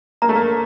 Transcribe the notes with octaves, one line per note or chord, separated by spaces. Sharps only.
A#3 A#5
A3
A#3